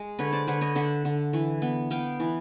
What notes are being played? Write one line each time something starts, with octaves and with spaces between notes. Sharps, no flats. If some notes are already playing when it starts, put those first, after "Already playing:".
Already playing: G#3
D3 B4 C#5
C5 D5
D3 B4 C#5
C#5 D#5
D3 E5 F#5
D3
E3
B3
B3 F5 G5
E3